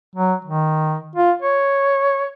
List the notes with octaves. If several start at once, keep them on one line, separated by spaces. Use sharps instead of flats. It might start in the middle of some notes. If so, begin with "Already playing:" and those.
F#3
D#3
F4
C#5